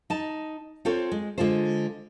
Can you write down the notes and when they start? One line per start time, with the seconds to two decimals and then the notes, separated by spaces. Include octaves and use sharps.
0.10 D#4 A5
0.85 C4 F4 A4 C5 C#5
1.12 G#3
1.38 D3 G#3 F4 A4 C5